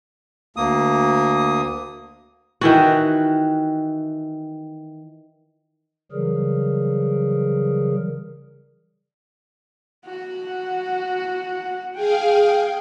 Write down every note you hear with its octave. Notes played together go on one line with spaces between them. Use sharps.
D2 A#3 D#6
D#3 E3 F#4
C#3 E3 F#3 G3 G#4 A#4
F#4 F#5
G#4 F5 G5